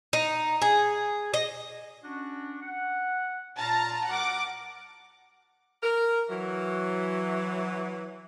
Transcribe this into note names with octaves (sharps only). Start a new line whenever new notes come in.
D#4
G#4
D#5
C#4 D4 F#4
F#5
A#2 F4 A5 A#5
G3 F#4 A#4 F#5 D6
A#4
E3 F#3